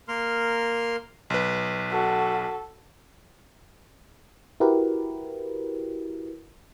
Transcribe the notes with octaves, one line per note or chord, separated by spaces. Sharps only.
A#3 A#4 C6 F6
B1 B4
F#4 A4
E4 F#4 G4 A#4 B4